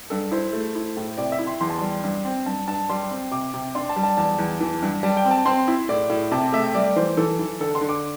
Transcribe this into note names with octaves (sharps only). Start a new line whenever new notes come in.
G2 A4
E4 C5
A3
E4
A2
C3 D5
E5
E4
C6
E2 C6
A5
G3 C6
G2
C4
G2 A5
G2 A5
G3 C6
C4
C3 D6
C3
D4 C6
A5
G3
A5
E2 A5
E2
E3
G2
G3 A5
G5
C4
A5
C4 C6
E4
A2 D5
A2
C3 A5
A3 E5
G3 D5
E3 C5
E3 A4
E3
D3 A4
C6
D3
D6